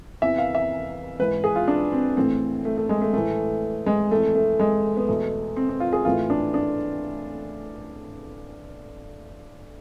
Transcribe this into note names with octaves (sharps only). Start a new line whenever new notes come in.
E2 C3 E3 E5
F5
E5
G#2 E3 B4
G#4
F4
D4
C4
A2 E3 C4
A3
A3
G#3
A3
A2 E3 A3
G#3
F2 E3 A3
A3
G#3
B3
E2 B2 A3
C4
C4
F4
G#4
A2 E3 F4
D4
D4